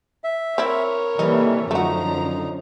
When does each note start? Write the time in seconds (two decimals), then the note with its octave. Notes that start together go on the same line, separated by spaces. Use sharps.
0.24 E5
0.58 C4 E4 A#4 C#5
1.19 C3 E3 G3 A#3 D#4 A4
1.71 F#2 D3 F3 A3 D#4 F#4 A#5